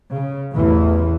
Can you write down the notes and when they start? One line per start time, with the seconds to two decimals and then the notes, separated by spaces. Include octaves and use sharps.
0.13 C#3
0.55 A1 E2 E3